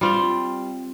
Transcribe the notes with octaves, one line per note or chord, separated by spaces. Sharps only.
G3 C4 F4